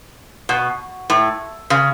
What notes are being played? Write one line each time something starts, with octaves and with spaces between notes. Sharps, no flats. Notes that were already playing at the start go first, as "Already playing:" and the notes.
B2
A2
C#3